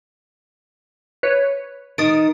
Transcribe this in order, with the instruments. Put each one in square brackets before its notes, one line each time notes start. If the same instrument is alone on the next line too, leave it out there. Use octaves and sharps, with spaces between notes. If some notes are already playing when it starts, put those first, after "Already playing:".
[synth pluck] B4 C#5
[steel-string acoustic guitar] D#3 [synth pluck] D#6 A6 D7